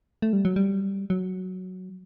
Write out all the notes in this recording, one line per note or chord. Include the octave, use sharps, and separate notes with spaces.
A3
G3
F#3
G3
F#3